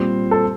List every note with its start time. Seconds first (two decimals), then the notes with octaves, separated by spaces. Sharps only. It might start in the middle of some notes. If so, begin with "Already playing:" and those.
Already playing: A#2 G3 C4 C5
0.31 A4